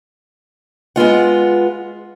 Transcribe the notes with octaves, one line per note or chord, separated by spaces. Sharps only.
G#3 B3 F4 F#5